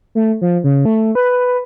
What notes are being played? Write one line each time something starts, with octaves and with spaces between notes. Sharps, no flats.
A3
F3
C#3
A3
B4